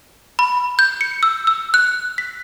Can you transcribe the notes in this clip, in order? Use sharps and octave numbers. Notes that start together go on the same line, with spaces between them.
B5
G6
C#7
E6
E6
F#6
B6